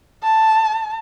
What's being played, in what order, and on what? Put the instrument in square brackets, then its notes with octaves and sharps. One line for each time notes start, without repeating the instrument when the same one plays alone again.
[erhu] A5